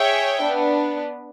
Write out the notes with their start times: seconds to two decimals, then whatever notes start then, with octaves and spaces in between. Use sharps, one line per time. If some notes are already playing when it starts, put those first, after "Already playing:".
Already playing: G#4 C#5 E5 G5
0.41 B3 D4